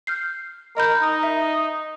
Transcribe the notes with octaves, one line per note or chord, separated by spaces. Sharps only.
F6 G6 C7
A#4 D#5 B5 G6
D#4
E5